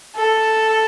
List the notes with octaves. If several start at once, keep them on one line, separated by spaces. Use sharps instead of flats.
A4